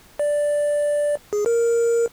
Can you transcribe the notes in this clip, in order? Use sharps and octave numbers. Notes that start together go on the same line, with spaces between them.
D5
G#4
A#4